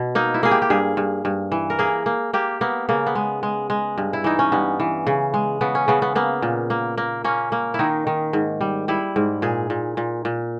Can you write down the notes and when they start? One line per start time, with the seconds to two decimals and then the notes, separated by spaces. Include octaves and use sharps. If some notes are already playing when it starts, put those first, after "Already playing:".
Already playing: B2
0.15 A#3 D#4
0.34 E4
0.43 A#3 G#4
0.51 G4
0.62 G4
0.70 G2 G#4
0.97 G2
1.25 G2
1.52 E3
1.70 A#4
1.79 A#3 G#4
2.06 A#3
2.34 A#3 G4
2.61 A#3 B3
2.89 C#3 A#3
3.07 B3
3.15 G#3
3.43 G#3
3.70 G#3
3.98 G2
4.13 E4
4.24 E3 D#4
4.39 C#4
4.52 G2 B3
4.80 E3
5.07 C#3
5.34 G#3
5.61 C#3 B3
5.75 C#4
5.88 C#3 B3
6.02 B3
6.15 A#3 B3
6.42 A#2
6.70 A#3
6.98 A#3
7.24 A#3 C#4
7.52 A#3
7.74 E4
7.79 D#3 D#4
8.07 D#3
8.33 G#2
8.61 G3
8.88 G3 E4
9.16 G#2
9.42 A#2 G#4
9.70 A#2
9.97 A#2
10.25 A#2